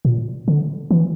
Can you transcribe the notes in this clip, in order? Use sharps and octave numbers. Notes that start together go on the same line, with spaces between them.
A#2
D3
E3